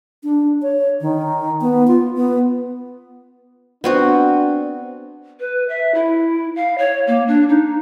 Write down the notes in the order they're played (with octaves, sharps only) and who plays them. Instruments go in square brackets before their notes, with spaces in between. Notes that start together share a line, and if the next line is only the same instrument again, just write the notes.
[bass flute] D4
C#5
D#3
B3
F4
B3
[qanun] B3 C4 F#4 [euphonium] D4
[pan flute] B4
E5
E4
F5
C#5
A#3
D4
D#4